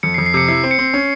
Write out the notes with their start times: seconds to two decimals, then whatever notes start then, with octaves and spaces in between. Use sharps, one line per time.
0.03 F2 C#7
0.14 C7
0.18 F2
0.26 C7
0.34 C3 C#7
0.48 E4 C7
0.64 C4
0.71 C#7
0.79 C4
0.94 C#4